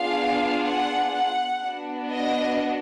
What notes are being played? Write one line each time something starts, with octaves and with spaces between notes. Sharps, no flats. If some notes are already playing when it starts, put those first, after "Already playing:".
Already playing: B3 D4 F4 G#4 F5
F#5
F#5
B3 D4 F#4
D#5